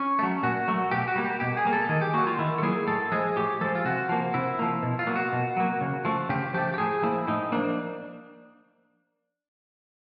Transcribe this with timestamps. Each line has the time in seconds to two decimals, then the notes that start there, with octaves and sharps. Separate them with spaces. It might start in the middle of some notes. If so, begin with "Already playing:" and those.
Already playing: C#4
0.19 F#3 A3
0.43 A#2 F#4
0.68 F#3 A3
0.91 B2 G4
1.08 F#4
1.16 G3 A#3
1.24 G4
1.40 B2 G4
1.57 G#4
1.65 G3 A#3
1.73 A4
1.89 D#3 G#4
2.01 G4
2.14 F#3 A#3 F#4
2.27 F4
2.39 D#3 E4
2.58 A4
2.62 F#3 A#3 G#4
2.87 A2 A4
3.12 F3 G#3 G#4
3.36 A2 G4
3.61 F3 G#3 A4
3.75 F4
3.85 C3 F#4
4.09 F3 A#3
4.34 C3 E4
4.59 F3 A#3
4.83 B2
4.99 F4
5.07 F#3 A#3
5.16 F#4
5.32 B2
5.57 F#3 A#3
5.81 C#3
6.05 F3 A3
6.29 C#3 G4
6.54 F3 A3 G4
6.74 G4
6.78 A2 G#4
7.02 F3 A#3 E4
7.27 A2 D#4
7.52 F3 A#3 D4